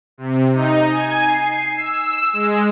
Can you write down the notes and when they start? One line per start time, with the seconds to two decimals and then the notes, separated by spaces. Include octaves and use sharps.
0.18 C3
0.54 D#4
0.89 G#5
1.24 C7
1.76 E6
2.33 G#3